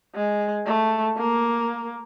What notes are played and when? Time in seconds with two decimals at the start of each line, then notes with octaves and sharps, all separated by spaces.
0.15 G#3
0.66 A3
1.17 A#3